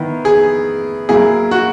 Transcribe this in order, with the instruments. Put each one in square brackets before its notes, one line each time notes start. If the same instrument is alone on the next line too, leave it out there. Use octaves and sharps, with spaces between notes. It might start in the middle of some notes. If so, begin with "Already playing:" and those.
Already playing: [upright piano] D#3 B3 E4
[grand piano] G#4
[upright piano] F#3 A#3 E4 [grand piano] G#4
[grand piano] F#4